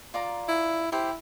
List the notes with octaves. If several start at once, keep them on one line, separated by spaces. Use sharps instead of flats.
F4 D5 A#5
E4
E4 G4 C5